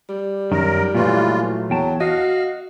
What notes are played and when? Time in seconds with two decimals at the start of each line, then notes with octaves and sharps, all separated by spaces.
0.09 G3
0.52 F#2 D#3 A#4
0.95 A#2 E3 F#3 A3 F4
1.70 E2 F#3 G5 A5
2.00 F#4 D#5 F5